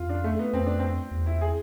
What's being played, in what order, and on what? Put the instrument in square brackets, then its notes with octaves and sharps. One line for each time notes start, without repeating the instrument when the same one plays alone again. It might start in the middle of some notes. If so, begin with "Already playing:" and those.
Already playing: [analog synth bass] F2 [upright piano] F4
[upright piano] D4
A3
B3
[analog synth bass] F2 [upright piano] C4
[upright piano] D4
C4
[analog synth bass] E2
[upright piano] E4
G#4